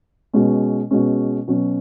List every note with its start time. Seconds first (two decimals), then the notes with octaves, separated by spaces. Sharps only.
0.33 B2 G#3 C#4
0.91 B2 G#3 C#4
1.48 B2 F#3 C#4